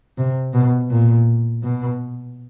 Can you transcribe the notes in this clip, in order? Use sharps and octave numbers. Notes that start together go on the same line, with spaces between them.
C3
B2
A#2
B2